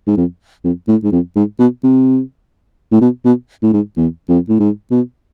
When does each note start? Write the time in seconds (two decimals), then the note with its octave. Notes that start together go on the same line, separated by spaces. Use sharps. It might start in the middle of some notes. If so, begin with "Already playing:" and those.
0.07 G#2
0.17 F2
0.64 F2
0.88 A2
1.04 G#2
1.12 F2
1.36 G#2
1.59 B2
1.83 C3
2.92 A2
3.01 B2
3.25 B2
3.63 A2
3.73 G#2
3.97 E2
4.28 F2
4.49 A2
4.60 G#2
4.91 B2